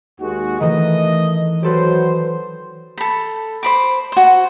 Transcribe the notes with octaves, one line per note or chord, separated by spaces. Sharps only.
D#2 G#3 F#4
D#3 E3 A3 D#5
F#3 G4 A4 B4 C5
A4 B5
C5 B5 D6
F#4 C5